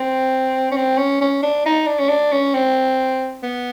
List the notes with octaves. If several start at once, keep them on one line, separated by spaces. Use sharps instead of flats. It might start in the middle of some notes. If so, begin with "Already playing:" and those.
Already playing: C4
C#4
C4
C#4
C#4
D4
D#4
D4
C#4
D4
C#4
C4
B3